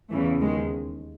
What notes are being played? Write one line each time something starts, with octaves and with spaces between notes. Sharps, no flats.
E2 C#3 E3 A3
D#2 D#3 G#3